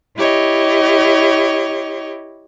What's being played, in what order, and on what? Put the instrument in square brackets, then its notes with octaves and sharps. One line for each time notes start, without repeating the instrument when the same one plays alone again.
[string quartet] E4 G4 C#5 D#5